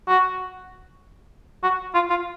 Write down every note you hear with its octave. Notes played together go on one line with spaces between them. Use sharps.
F#4
F#4
F4
F4